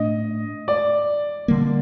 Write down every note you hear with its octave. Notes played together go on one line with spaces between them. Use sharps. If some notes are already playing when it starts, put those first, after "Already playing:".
Already playing: A2 A3 D4 D#5
D5
D3 G3 A#3